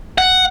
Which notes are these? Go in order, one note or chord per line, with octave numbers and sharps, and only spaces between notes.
F#5